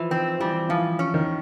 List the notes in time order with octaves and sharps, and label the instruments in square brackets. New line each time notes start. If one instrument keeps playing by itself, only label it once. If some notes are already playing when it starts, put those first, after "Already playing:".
Already playing: [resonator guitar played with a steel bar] E3 [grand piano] F3
[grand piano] D#3 [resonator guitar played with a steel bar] C4
[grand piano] E3 [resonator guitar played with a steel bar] G3
[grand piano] E3 [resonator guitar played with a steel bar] F3
[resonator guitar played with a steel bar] C#4
[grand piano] D#3